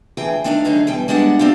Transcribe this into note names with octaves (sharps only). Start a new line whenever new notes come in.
D2 E3 G#4 B4 G5
D#3 A3 D4 D#4 D5 F5
F#2 D3 C#4 D#4 G#4
B2 E3 G3 G5
G3 G#3 B3 D4 F5 F#5
C4 D4 F4 G4